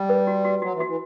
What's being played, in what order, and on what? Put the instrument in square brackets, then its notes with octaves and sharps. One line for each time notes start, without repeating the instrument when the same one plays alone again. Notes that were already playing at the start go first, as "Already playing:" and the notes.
Already playing: [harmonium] G3
[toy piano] B4
F#4
F#4
[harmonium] F#3 [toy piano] F#4
[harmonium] E3
[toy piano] F#4
[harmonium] E3